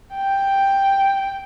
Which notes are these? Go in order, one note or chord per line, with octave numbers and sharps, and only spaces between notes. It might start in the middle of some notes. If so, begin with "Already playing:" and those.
G5